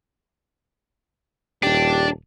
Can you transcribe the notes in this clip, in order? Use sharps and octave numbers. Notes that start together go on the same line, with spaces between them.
D#1 D4 G4